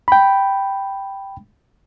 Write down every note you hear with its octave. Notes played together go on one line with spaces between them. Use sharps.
G5 B5